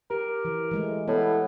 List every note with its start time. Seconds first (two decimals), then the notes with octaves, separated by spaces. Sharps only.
0.10 G4 A#4
0.45 E3
0.71 E3 G#3 A3
1.08 A2 B3